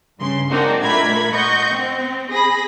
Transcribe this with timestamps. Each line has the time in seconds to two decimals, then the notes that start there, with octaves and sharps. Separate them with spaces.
0.19 G2 C#3 C6
0.51 G#3 A#3 C4 D4 D#4 F#4
0.82 A#2 A3 A#4 B5 G#6 B6
1.33 D#5 F#5 C6 C#6 G6
1.72 C4
2.33 G#4 B5 A#6